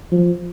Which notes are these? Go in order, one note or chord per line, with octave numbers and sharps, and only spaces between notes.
F3